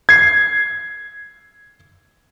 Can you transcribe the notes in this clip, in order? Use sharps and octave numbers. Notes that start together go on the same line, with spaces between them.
G#6 C7